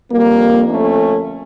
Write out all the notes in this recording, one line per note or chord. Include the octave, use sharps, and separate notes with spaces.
F2 D3 G3 A#3
A3 C#4